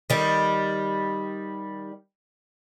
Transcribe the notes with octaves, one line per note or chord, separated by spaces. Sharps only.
D#3 G3